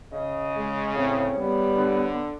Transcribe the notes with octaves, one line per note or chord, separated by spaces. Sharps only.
C#3 D#5
G#3
A2 C4 C#5
G3 B3
D3